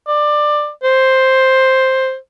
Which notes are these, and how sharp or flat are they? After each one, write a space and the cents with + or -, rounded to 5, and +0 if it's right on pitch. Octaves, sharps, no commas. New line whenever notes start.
D5 +20
C5 +5